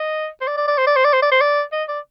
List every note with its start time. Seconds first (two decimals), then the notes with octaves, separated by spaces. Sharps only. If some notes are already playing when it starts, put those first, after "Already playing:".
Already playing: D#5
0.41 C5
0.47 D5
0.57 D5
0.68 D5
0.78 C5
0.86 D5
0.96 C5
1.04 D5
1.13 C5
1.22 D5
1.32 C5
1.41 D5
1.72 D#5
1.88 D5